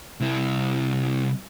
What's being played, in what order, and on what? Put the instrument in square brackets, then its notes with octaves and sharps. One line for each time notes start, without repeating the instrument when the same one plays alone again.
[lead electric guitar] C2 E4